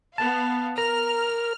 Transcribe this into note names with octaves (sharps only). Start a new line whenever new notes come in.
B3 F5 A5
A#4 A#5 F6